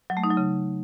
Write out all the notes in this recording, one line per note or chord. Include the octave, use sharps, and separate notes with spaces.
F#3
A3
D#4
F#3
C#3